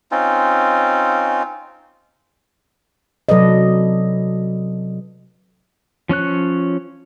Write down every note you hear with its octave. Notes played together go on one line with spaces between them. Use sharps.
C4 C#4 D#4 F4
C3 F#3 A4 B4 D5 D#5
F3 C#4 C#5 F#6